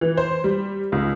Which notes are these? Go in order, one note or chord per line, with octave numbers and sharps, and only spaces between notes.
E3
C5
G3
C#2